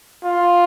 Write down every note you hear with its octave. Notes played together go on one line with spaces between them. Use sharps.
F4